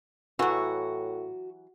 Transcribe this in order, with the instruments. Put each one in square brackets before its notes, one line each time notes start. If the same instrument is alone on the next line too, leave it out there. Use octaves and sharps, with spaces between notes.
[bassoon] A2 [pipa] E3 F#3 [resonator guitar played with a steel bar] F#4